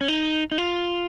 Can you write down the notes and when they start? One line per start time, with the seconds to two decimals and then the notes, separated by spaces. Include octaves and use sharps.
0.01 C#4
0.08 D#4
0.52 D#4
0.58 F4